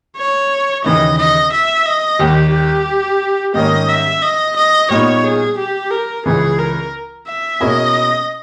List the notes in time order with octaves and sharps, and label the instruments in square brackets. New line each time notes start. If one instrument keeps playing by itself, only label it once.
[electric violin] C#5
[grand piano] D#2 C#3 E3 A#3 D#4 [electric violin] D#5
[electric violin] D#5
E5
D#5
[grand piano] D#2 D#3 G3 [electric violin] G4
[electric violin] G4
[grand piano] G#2 D#3 G3 A#3 C#4 [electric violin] D#5
[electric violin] E5
D#5
D#5
[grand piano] A#2 G3 B3 D#4 [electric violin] C#5
[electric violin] G#4
G4
A#4
[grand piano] C#2 C#3 E3 [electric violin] G#4
[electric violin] A#4
E5
[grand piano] B2 A#3 C#4 E4 G#4 [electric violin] D#5